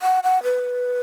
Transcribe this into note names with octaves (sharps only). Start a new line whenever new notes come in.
F#5
F#5
B4